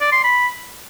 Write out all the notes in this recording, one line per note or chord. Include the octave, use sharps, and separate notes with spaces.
D5
C6
B5